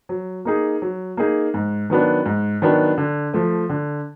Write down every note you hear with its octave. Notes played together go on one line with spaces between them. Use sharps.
F#3
A#3 D#4 G#4
F#3
A#3 D#4 G#4
G#2
D#3 F#3 B3 D4
G#2
D#3 F#3 B3 D4
D3
F3 A3
D3